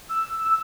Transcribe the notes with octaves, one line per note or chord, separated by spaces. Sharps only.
E6